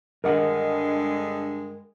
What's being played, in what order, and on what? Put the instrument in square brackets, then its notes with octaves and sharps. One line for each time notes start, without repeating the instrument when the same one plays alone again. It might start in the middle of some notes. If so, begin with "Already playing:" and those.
[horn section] G2 D3 G#3 [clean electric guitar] A#4 D#5 F#5